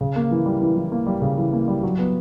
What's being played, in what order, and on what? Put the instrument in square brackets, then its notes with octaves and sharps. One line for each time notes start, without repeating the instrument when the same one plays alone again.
[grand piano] C#3
A#3
E3
G3
E3
E3
A#3
G3
C#3
E3
A#3
G3
F#3
B3